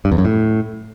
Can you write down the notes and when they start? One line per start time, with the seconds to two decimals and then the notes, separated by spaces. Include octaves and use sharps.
0.05 G2
0.12 E2
0.18 F#2
0.25 A2